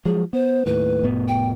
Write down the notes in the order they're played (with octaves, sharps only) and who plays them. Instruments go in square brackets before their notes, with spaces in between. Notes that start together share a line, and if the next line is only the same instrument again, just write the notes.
[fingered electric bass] F3 F#3 G#3 [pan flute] G#4
[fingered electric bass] B3 [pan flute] C5
[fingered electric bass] D#2 A2 [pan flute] B4
[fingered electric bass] F1 A2 B3
[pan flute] G5